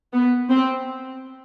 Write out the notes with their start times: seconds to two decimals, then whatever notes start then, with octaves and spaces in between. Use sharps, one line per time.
0.13 B3
0.49 C4